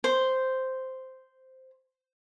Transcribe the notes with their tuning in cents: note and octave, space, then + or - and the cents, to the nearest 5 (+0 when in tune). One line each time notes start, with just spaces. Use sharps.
C5 -5